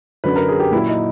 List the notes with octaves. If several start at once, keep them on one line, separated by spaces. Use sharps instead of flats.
F#2 D3 F#3 B4
A#4
G#4
G4
A#2 F#3 E4
D#4